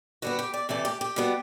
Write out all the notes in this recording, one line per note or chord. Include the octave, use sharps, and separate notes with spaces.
D3 G3 B3 F#4
G4
D5
C3 E3 A3 D5
G4
G4
B2 G3 B3